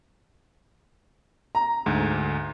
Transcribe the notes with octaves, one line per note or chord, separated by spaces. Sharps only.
A#5
D2 G#2